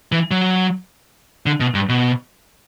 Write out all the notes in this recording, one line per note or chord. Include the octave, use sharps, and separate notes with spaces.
E3
F#3
D3
B2
G2
B2